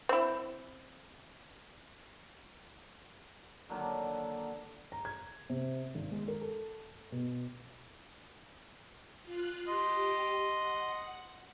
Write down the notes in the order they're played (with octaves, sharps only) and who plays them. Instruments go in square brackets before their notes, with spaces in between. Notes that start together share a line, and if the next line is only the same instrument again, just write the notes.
[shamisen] C4 E4
[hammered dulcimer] D3 D#3 F#3 A#3
[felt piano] A#5
G#6
C3
G#1
G#3
A#4
A4
B2
[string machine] F4 F#6
[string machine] G4 [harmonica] D#5 C6
[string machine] F#5